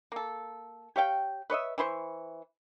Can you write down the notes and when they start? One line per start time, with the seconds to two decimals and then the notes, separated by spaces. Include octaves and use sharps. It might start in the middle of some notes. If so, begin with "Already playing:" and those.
0.12 A#3 A4
0.96 G4 C#5 F5 G5
1.50 B4 C#5 D#5 E5
1.78 E3 E4 C5 C#6